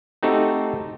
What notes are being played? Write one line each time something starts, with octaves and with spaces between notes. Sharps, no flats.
A3 C4 D#4 F#4 G4 A4